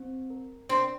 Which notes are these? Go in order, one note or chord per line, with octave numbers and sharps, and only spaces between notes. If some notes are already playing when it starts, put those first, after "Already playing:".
Already playing: C4
A#4
C4 D4